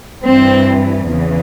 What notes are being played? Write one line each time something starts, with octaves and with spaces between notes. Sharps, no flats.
G2 E3 C4
E2 C#3 E3